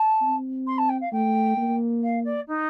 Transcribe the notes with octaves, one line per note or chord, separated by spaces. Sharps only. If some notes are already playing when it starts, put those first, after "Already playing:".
Already playing: A5
C4
C6
A5
G5
F5
A3 G5
A#3
F5
D5
D#4